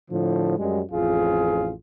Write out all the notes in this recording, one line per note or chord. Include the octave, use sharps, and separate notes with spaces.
A2 D3 F3
F#2 G3 G#3
A1 F2 F4 G#4